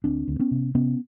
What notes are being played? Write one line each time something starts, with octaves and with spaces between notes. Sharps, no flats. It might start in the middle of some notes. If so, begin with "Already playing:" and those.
D2 C4 D4
D2
B3 C#4
C3
C3 B3 C#4